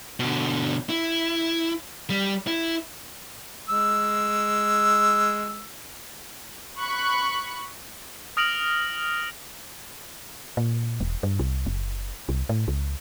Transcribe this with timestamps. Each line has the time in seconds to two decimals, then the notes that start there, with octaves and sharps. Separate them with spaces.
0.20 B2 D3
0.90 E4
2.10 G3
2.47 E4
3.69 G#3 E6
6.79 B5 C#6 F#6
8.37 D#6 F6 A#6 D7 F7 F#7
10.57 A#2
11.00 E1
11.23 G2
11.39 C2
11.66 F#1
12.29 C2
12.49 A2
12.68 C#2